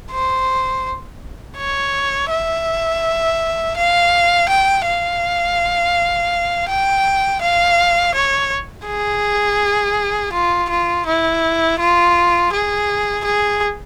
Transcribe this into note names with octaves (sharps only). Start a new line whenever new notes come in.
C5
C#5
E5
F5
G5
F5
G5
F5
C#5
G#4
F4
F4
E4
F4
G#4
G#4